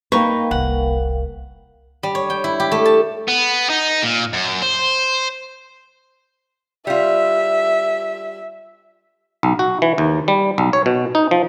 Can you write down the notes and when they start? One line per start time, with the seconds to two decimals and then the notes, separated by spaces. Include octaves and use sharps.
0.12 A#3 D#4 A#4 B4 F5 G5 C#6
0.51 F1 C2 F#5
2.03 G3
2.15 C#5
2.30 G5
2.44 E4
2.60 G4
2.71 A3
2.85 A5
3.28 B3
3.69 D#4
4.03 A#2
4.33 F#2
4.62 C5
6.87 G3 F4 E5
9.43 B1
9.59 F#4
9.82 E3
9.98 D#2
10.28 G3
10.58 B1
10.73 C#5
10.86 B2
11.15 D#4
11.31 F3